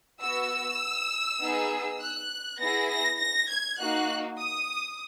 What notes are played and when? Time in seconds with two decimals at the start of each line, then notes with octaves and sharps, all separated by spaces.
0.21 B3 F#4 E6
1.40 B3 D#4 G#4
2.01 F#6
2.60 B3 E4 G#4 A#6
2.90 A#6
3.19 A#6
3.49 G#6
3.79 A#3 D#4 F#4 F#6
4.39 D#6